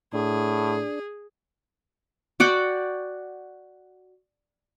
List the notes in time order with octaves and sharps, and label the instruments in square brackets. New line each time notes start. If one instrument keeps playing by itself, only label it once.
[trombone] A2 [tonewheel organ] D4 [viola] G#4
[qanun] F#4 D5 F#5 G5